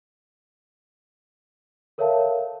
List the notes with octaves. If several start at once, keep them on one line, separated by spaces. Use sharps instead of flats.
A4 A#4 C#5 E5 F5 A5